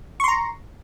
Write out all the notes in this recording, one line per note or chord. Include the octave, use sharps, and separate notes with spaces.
A#5 C6 C#6